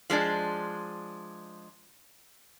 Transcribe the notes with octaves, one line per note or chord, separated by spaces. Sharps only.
F3 G#3 D4 D5